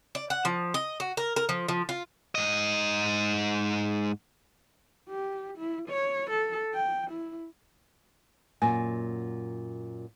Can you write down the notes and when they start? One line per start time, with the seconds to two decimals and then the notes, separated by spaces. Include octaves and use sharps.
0.15 D5
0.30 F#5
0.45 F3
0.74 D#5
1.00 F#4
1.17 A#4
1.36 A#4
1.49 F3
1.68 F3
1.89 F4
2.35 G#2 D#5
5.09 G4
5.58 E4
5.88 C#5
6.30 A4
6.74 G5
7.10 E4
8.62 F#2 A#2 G#5